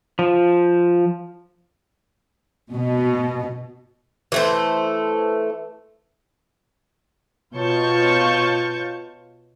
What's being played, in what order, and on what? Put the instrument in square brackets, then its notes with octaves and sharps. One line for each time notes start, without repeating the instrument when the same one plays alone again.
[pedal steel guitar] F3
[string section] B2
[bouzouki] E3 A3 C5
[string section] B2 F4 C#5 A5 C#6 G6